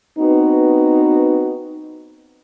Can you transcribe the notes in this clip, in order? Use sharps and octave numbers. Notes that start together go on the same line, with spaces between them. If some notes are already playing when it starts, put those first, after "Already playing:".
B3 C4 D#4 F#4 B4